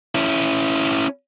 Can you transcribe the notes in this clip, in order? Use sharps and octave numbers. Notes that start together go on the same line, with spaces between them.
C#4 E4